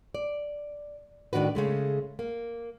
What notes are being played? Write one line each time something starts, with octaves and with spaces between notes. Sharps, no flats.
D5
A2 D#3 D4 F#4 B4
C#3 G#3 A3
A#3